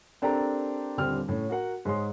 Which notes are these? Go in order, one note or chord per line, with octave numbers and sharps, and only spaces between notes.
C4 D4 G4 A4 A#4 A#5
D#1 D3 G3 C4 G5 F6
A2 C#4
F#4 A#4 F#5
G#2 G#4 C#5 C6